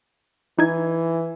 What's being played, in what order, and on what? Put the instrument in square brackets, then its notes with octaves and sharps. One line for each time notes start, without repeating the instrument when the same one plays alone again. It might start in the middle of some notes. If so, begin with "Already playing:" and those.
[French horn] E3 [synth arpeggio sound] D#4 E4 G#6